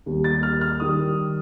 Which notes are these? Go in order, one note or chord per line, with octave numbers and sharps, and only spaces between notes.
D#2 D#3 G3
A6
F6
F6
D#3 G3 D#6